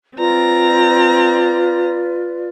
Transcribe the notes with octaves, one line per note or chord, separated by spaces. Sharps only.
C4 F4 B4 D5 A#5